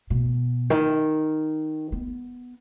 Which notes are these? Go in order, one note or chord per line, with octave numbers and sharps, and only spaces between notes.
B2
D#3
B3